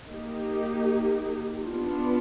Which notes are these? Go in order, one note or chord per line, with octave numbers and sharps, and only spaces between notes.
A#3 D#4 G4
B3 D4 F4